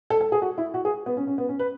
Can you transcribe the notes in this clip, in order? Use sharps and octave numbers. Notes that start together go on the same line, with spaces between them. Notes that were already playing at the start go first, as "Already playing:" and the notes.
A4
A4
G#4
F#4
E4
F#4
G#4
B3
C#4
C#4
B3
C#4
B4